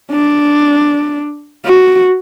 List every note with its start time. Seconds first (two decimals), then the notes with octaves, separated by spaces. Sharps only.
0.12 D4
1.66 F#4